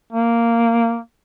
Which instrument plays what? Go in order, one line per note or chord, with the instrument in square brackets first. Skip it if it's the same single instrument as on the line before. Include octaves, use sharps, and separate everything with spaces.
[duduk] A#3